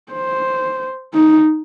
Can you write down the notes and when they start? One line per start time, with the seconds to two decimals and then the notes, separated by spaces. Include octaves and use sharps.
0.12 C5
1.14 D#4